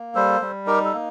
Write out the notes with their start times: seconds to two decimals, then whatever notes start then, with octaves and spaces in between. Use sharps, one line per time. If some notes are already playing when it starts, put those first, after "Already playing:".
Already playing: A#3
0.15 G3 A4 C5
0.41 G3
0.67 D#4 G4 A#4
0.85 A4
0.93 A#3